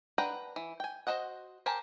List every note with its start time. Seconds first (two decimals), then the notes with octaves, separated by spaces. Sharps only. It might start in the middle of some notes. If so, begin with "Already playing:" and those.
0.18 D4 B4 F#5 G5 A#5
0.56 E3
0.80 G5 G#5
1.07 F#4 G#4 C5 D#5 F#5
1.66 G4 A#4 C5 G#5 A5